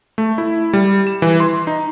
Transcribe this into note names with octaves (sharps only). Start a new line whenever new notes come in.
A3
E4
G3
E7
E3
C6
D#4